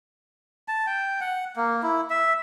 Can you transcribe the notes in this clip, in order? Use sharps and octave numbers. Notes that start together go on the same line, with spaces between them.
A5
G5
F#5
A#3
E4
E5